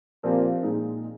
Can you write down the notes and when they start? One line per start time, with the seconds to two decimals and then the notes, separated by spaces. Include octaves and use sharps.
0.23 A#2 F3 C4 G4
0.63 A#2 G#3 D#4